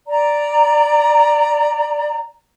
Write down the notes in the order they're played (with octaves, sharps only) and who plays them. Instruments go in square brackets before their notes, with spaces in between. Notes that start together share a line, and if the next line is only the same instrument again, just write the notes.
[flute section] D5 A#5